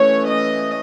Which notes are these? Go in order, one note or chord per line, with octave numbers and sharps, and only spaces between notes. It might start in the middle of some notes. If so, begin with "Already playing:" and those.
Already playing: E3 A3 C#4 C#5
D#5